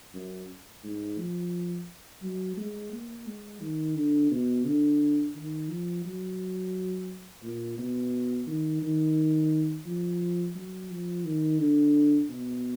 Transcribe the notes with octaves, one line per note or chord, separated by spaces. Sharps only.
F#2
G#2
F3
F#3
G#3
A#3
G#3
D#3
D3
B2
D3
D#3
F3
F#3
A#2
B2
D#3
D#3
F3
F#3
F3
D#3
D3
B2